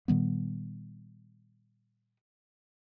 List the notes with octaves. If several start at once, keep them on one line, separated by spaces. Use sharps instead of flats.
A#2 D#3 G3 B3